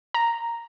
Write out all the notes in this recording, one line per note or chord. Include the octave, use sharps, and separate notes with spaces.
A#5